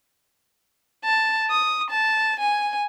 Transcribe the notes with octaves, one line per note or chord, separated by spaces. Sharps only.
A5
D#6
A5
G#5